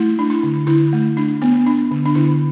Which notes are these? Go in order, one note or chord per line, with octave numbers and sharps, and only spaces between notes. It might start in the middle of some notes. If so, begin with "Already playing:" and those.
Already playing: A3 E4
D4
E4
D3
D3 E4
A3
D4
B3
D4
D3
D4
D3 E4